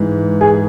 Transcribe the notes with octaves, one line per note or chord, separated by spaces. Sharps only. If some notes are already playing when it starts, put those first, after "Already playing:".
Already playing: G#2 E3
G#4